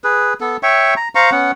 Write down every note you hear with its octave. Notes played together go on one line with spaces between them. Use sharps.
G#4 B4
B3 A4
C#5 E5 G5 C#6
A#5
C5 F5 A#5 C#6
B3 C#4 F#5